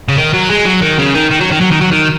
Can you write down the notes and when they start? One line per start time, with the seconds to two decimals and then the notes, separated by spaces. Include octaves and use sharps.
0.09 C#3
0.17 D#3
0.33 F#3
0.50 G#3
0.66 F#3
0.82 D#3
0.98 C#3
1.14 D#3
1.31 D#3
1.40 F#3
1.51 D#3
1.61 F#3
1.71 D#3
1.81 F#3
1.91 D#3